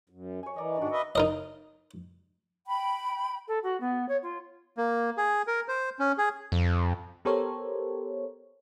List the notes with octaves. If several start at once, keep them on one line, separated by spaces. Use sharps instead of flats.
F#2
C#5 G#5
E3 A#4 D5 D#5
G#2 D#3 D4 F#4 D5
B4 D#5 E5
D#4 A#4 D#5
G5 B5
A4
F#4
B3
C#5
F4
A#3
G#4
A#4
C5
C#4
G#4
F2
B3 G4 A4 A#4 C5 C#5